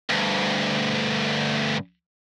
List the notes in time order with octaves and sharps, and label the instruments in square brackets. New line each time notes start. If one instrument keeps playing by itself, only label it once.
[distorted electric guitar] D2 G2